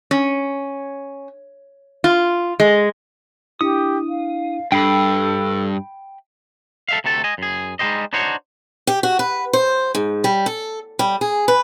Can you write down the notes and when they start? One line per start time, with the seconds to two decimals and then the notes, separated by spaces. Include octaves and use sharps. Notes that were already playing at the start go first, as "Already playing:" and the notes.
0.11 C#4
2.04 F4
2.60 G#3
3.61 D4 E4 G4 D#6
4.09 F5
4.72 G2 D4 A4 G5 B5 C7
6.89 A4 E5 F5
7.04 D2 C3 A3 A4 A5
7.24 D#5 G#5
7.38 F#2 G#4
7.79 G3 G#3 D#4 G4 C5 D#5
8.13 D4 D#4 F#4 C5 C#5
8.87 G4
9.03 F#4
9.19 B4
9.53 C5
9.95 G#2
10.24 G3
10.46 A4
10.99 G3
11.21 G#4
11.48 B4